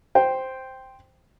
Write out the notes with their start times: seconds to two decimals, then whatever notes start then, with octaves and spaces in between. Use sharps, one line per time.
0.15 C5 G5